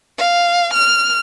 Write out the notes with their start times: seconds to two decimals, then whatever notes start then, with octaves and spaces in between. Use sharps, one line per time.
0.19 F5
0.74 F6